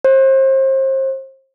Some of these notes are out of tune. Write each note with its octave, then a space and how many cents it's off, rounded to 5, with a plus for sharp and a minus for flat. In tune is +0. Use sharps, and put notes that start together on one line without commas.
C5 +35